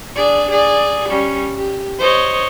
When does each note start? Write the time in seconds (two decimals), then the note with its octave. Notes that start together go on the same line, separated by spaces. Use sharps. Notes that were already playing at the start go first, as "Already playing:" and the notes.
0.16 D4 G#4 D5
0.51 G#4 D5
1.09 G3 C#4
1.57 G4
1.99 C5 C#5 D#5